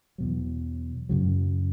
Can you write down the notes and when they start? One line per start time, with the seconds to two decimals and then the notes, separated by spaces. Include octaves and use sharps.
0.18 E2 B2 F#3
1.09 F#2 C#3 F#3